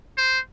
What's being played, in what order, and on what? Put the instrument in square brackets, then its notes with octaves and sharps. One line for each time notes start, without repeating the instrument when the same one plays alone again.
[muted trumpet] C5